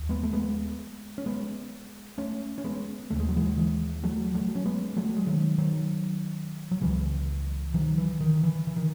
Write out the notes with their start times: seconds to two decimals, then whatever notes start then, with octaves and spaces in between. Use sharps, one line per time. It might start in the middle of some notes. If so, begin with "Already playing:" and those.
Already playing: D#2
0.09 G#3 B3
0.23 A3
0.33 G#3 B3
1.18 C#4
1.26 G#3 B3
2.18 A3 C#4
2.58 C#4
2.64 G#3 B3
3.10 D#2 C#3 A3
3.20 G#3
3.29 F#3
3.36 E3 G#3
3.57 E3 G#3
4.04 F#3 A3
4.35 F#3 A3
4.55 C#4
4.65 G#3 B3
4.97 F#3 A3
5.17 G#3
5.27 D#3 F#3
5.58 D#3 F#3
6.71 F#3
6.81 C#2 C#3 E3 G#3
7.74 D#3 F#3
7.98 E3
8.21 D#3
8.43 E3
8.67 E3
8.76 D#3